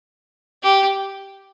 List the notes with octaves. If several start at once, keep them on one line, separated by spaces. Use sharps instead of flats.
G4